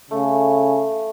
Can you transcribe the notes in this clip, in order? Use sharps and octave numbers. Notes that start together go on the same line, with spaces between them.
C#3 A3